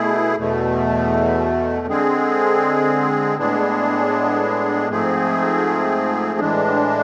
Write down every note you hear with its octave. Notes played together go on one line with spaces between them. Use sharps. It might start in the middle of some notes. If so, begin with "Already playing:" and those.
Already playing: B2 A3 E4 G#4
E2 B2 A3
D3 G#3 C4 G#4
A2 G#3 B3 D4 G#4
G#2 F3 A3 C4 G#4
A2 E3 G#3 D4